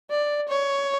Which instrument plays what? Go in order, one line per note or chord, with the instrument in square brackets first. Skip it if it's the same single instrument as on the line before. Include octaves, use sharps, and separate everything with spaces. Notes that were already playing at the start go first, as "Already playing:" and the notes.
[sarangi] D5
C#5